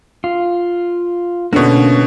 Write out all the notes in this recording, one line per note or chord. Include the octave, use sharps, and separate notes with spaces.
F4
B2 D3 A#3 C#4